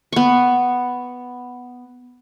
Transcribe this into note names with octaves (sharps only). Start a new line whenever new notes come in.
B3 C#6